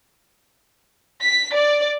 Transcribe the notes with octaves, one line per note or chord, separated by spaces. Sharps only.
B6
D5